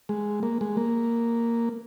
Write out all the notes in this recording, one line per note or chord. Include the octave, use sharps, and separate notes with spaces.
G#3
A#3
G#3
A#3